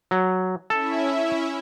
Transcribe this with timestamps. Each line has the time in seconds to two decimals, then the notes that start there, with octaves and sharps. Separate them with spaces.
0.11 F#3
0.70 C#4 E4 A4 E5